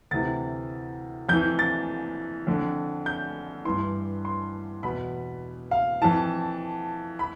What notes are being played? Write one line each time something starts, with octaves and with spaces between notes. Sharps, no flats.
D2 C3 E3 A6
F2 E3 G6
A6
F2 D3
G6
G2 E3 C6
C6
E2 B2 B5
F5
F2 E3 A5
B5